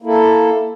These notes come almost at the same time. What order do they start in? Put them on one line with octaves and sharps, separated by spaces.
A#3 E4 A4